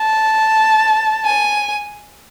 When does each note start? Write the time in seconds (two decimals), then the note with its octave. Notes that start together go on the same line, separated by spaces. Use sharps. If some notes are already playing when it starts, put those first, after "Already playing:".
Already playing: A5
1.25 G#5